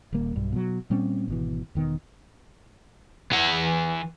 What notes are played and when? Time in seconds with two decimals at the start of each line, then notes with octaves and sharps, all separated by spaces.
0.13 D#1 D#2 G3 A#3
0.36 B1 G2
0.52 B2 F#3
0.90 A#2 G3 C4 C#4
1.28 G#1 B2 E3
1.75 E1 D#3 B3
3.32 E3 F#5